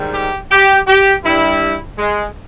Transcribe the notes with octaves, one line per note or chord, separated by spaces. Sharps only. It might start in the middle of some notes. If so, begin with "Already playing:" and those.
Already playing: G#2 D#3 G3
G4
G4
G4
G2 G3 E4
G#3